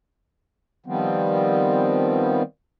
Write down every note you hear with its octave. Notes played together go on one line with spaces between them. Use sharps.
D#3 F3 G3 B3 C4